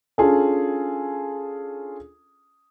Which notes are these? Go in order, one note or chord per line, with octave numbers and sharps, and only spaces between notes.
C#4 D4 F4 G#4 A4